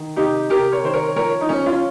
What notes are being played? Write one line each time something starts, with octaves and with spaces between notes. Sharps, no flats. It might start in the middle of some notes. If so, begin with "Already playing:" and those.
Already playing: D#3
C3 D#4 G4
C3 G4 A#4
A#4 C#5
D#3 C5
A#4 C#5
F3 A#4 C#5
D#4
F3 C#4
C#4 F4